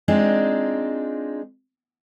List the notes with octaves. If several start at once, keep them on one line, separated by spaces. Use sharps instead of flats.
G#3 C4 D4 D#4 F4